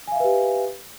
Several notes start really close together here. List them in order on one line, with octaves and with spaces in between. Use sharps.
G#5 F5 E5 B4 G4